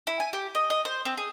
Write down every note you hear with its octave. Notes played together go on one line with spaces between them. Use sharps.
E4
G#5
G4
D#5
D#5
C5
C4
G#4